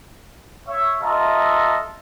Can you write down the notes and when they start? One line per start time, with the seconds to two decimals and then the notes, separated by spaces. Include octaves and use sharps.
0.67 C#5 E5
1.02 F4 A4 D#5 E5 A#5